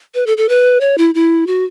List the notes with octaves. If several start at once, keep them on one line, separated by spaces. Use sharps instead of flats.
B4
A4
A4
B4
C#5
E4
E4
F#4